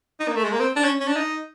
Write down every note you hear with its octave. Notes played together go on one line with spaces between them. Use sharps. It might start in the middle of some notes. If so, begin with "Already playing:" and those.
D#4
A#3
A3
G#3
A#3
C4
D4
C#4
C#4
D4
D#4